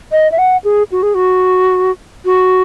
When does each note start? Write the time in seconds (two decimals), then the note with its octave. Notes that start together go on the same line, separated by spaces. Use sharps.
0.12 D#5
0.32 E5
0.38 F#5
0.64 G#4
0.92 F#4
1.03 G#4
1.15 F#4
2.25 F#4